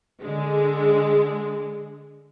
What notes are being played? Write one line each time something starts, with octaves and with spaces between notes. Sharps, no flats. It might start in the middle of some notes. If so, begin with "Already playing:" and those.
D3 G#3